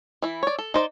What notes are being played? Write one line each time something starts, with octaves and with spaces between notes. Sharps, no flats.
E3 E4
C#5 D5
A4
D#4 C5 D5